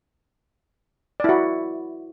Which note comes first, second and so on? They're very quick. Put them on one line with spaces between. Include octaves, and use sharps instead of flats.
D5 E4 F#4